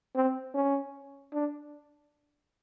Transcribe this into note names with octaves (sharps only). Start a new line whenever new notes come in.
C4
C#4
D4